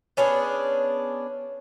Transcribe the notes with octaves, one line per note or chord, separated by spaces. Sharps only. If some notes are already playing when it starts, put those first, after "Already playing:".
B3 C#4 D4 G#4